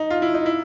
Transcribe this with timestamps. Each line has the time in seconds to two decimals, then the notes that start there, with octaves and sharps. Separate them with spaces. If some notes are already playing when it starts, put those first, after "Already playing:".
Already playing: D#4
0.10 F4
0.22 E4
0.34 D#4
0.46 E4